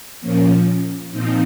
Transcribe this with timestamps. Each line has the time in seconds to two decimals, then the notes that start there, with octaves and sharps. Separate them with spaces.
0.21 A#2 F3 A#3 C#4
1.12 A#2 F3 C4 D#4